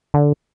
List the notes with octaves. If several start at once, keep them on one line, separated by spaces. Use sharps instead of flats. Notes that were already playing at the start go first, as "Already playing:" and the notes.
D3